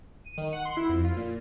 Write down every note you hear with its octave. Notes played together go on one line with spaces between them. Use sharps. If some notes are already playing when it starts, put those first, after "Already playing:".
D#7
D#3
F#5
C6
E4
F2
F4
A#2